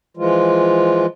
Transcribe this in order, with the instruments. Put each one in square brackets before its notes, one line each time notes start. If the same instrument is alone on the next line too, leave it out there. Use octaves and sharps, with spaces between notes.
[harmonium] E3 F3 G#3 F4